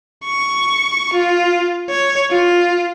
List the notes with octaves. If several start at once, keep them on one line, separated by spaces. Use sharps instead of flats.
C#6
F4
C#5
F4